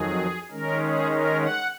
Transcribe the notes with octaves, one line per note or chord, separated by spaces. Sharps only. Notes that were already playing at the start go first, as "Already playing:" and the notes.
Already playing: F2 D#3 F#3 G#4
D#3 G#3 C#4 A#4
G#4
A#4
F#5